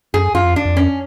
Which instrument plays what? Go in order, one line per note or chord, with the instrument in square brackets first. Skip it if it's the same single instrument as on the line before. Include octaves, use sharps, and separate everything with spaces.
[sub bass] F#2 [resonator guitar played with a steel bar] G#4
[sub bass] F#2 [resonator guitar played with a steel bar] F4
[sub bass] F2
[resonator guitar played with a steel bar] D4
[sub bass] F2
[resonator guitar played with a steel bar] C#4